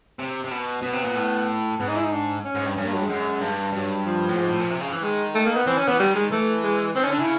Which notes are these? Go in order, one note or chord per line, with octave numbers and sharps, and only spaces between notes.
C3
C3
B2
B2 B3
C3
A#2
A2
G#2 B3
D#4
E4
D#4
D4
C#4
G#2
G2
G2 C#4
A#3
F#3
G#3
F#2
G2
G2 F#3
F3
A2
G#2
A2
A#2
C3
C#3
F3
E3
D#3 G#3
A3
A#3
B3
E3 C4
C#4
E3 B3
D#3 G3
G#3
E3 A3
G#3
D#3 C4
C#4
D3
D4
C#3 E4